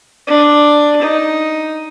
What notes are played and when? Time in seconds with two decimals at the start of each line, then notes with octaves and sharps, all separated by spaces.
0.27 D4
1.02 D#4